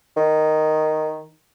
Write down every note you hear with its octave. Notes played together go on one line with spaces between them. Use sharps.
D#3